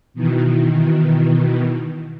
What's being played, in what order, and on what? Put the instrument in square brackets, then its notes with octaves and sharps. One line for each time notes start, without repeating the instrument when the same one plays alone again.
[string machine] B2 D#3 E3